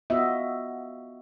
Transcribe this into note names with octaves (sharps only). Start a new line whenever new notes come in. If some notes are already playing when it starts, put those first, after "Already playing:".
B3 F4 F#4 D#5 E5